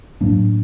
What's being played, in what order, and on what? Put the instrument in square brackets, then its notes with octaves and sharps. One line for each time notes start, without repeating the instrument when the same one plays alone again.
[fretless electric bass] A2 F#3 A#3 D4